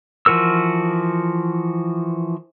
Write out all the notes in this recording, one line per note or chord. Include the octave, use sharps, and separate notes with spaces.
E3 F3 F#4 A#4 E6